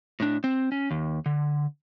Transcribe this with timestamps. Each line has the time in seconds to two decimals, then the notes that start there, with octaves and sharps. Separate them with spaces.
0.20 A2 D4
0.44 C4
0.72 C#4
0.91 D#2
1.26 D3